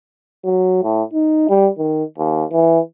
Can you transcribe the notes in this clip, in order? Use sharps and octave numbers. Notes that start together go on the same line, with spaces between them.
F#3
A2
D#4
G3
D#3
D#2
E3